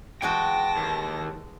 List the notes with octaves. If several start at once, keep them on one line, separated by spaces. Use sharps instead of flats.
E3 G#3 F#4 G5 A5 A#6
D#2